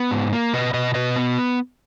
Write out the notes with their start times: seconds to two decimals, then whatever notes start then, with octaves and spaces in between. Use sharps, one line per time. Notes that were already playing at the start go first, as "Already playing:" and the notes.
Already playing: B3
0.11 G#2
0.32 A#3
0.53 B2 B4 D#5
0.74 B2 B4 D#5
0.95 B2 B4 D#5
1.16 B3